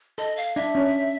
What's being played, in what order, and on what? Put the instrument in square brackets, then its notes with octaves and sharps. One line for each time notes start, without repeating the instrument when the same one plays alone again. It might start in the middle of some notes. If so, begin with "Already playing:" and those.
[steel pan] A4 [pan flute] D#5
[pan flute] F5
[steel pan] D4 [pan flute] E5
[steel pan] C#4